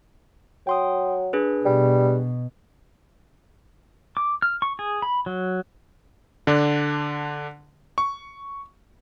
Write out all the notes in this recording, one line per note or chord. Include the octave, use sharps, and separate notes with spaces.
F#3 G5 C6 D#6
D4 G#4 B4
B2 G3
D6
F6
C#6
G#4
B5
F#3
D3 D4
C#6